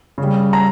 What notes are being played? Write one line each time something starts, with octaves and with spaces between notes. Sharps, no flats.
C#3
G3
A#5